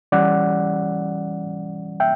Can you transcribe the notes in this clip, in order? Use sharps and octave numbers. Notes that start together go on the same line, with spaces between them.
E3 G3 C#4 D5 F#5
E5 G5